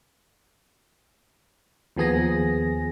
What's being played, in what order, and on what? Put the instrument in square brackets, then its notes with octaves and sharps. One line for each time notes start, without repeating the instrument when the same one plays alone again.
[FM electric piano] D#2 F3 B3 G#4 G#5 A#6